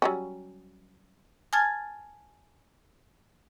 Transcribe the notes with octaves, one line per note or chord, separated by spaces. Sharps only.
F#3 G3 C#4
G#5 A5 F6 G#6 A6